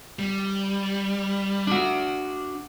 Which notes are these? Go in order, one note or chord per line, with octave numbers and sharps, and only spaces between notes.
G3
D4 F#4